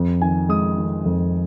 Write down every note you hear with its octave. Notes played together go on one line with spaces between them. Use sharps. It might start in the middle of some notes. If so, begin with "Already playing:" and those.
Already playing: F2
D#3 G#5
G#3 D#6
D#3
F2